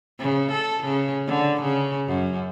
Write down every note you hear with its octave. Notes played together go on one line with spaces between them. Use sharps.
C#3
A4
C#3
D3
C#3
F#2